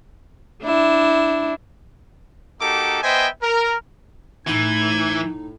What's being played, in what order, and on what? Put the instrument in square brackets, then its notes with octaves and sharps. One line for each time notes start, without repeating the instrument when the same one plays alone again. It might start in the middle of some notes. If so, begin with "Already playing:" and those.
[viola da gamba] D4 E4
[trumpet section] A#3 D#4 F#4 G4 A4 D6
B3 C5 D#5 E5 G5 G#5
A#4
[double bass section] A2 [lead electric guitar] E3 [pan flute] D#4 [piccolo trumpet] G#6